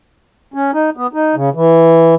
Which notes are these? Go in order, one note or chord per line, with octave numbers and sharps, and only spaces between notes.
C#4
D#4
B3
D#4
C#3
E3